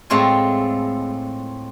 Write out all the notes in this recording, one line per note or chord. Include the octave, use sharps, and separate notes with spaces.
A2 G#3 A3 C4 F4 G#5